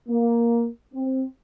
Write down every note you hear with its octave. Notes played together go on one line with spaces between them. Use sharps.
A#3
C4